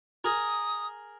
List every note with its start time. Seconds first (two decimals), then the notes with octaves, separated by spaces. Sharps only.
0.24 G#4 A#4 D#6